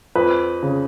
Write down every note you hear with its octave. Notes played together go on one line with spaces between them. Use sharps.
F2 B4
C#3